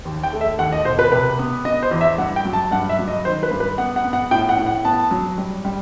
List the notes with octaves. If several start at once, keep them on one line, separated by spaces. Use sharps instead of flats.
D#2
G5
A3
E5
D#2 F#5
D#5
E1 C5
B4
C3 B4
B3
B3 D#5
C5
E2
E5
G2 F#5
G5
F#3
A5
G2 F#5
E5
F#3
D#5
D#3 C5
B4
G2
B4
B3 F#5
F#5
B3
F#5
A2 G5
F#5
A2
F#5
B3 A5
F#3
G3
G3